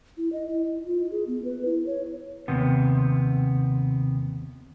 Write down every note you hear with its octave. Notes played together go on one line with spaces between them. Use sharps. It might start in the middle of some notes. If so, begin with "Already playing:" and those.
E4
D#5
E4
F4
G#4
B3
B4
E4
C#5
D#2 C3 B3